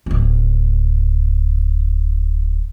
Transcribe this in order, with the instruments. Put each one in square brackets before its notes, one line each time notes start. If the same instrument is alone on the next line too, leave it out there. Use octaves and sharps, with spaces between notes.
[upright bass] D1 C#4